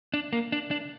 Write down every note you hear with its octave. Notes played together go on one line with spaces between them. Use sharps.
D4
A#3
D4
D4